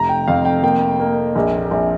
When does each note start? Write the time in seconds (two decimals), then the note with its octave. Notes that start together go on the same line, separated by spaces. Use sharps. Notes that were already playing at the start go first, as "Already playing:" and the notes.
Already playing: F1 A#5
0.09 G5
0.28 F2 F5
0.45 G5
0.63 A#3 G5
1.00 A#3
1.36 A#1
1.71 A#1